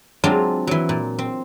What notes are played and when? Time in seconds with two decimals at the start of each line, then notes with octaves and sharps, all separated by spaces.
0.24 F#3 G#3 C4 D4 F4
0.67 E3 F#3
0.89 A#2
1.19 C4